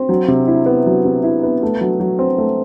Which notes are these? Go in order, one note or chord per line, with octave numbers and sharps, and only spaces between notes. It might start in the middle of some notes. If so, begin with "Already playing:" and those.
Already playing: C4
F#3
C3
E4
B3
F#3
C3
E4
B3
A3
F#3
F#3
C4
A3